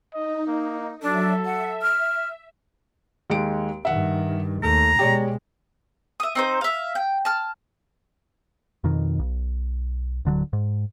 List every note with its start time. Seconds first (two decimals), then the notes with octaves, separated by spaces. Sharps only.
0.14 D#4 D#5
0.47 A#3
1.02 F#3 D4 A4 E5
1.45 E5 F#5
1.82 F6
3.30 D#2 G#3 D7
3.85 G2 D#3 E5 F#5
4.63 D#2 A3 A#5
4.99 B2 G#3 G4 C#5 D5
6.20 E5 D#6
6.35 C4 D#4 C5
6.61 E5 F5
6.95 G5
7.25 A5 F6
8.84 F2 B2 D#3
9.19 B1
10.25 D1 D3 E3 F#3
10.53 G#2